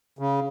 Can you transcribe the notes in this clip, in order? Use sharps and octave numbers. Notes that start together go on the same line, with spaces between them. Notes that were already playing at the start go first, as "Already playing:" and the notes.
C#3